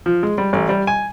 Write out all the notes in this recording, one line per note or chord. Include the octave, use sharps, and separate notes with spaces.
F3
G#3
G3
A1
G3
G#5